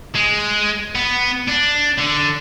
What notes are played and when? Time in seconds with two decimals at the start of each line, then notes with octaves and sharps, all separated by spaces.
0.15 G#3
0.95 B3
1.48 D4
1.98 D3